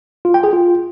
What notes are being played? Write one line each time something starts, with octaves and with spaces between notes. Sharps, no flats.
F4
G5
G#4
F4